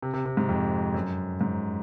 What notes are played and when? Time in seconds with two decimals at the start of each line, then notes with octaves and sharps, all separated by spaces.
0.03 C3
0.14 C3
0.26 C3
0.37 G#2
0.49 F2
0.94 F#2
1.41 G#2